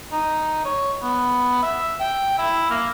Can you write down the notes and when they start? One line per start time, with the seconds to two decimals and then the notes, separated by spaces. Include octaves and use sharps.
0.12 D#4
0.65 C#5
1.02 B3
1.62 E5
2.00 G5
2.38 E4
2.70 A#3